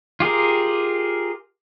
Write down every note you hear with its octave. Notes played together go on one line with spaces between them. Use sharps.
F4 G4 G#4 A#4